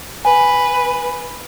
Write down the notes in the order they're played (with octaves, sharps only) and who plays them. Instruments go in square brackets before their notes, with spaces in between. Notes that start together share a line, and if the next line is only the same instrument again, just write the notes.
[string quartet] B4 [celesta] G#5